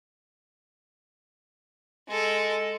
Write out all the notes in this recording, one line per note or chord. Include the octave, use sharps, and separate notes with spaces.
G#3 A4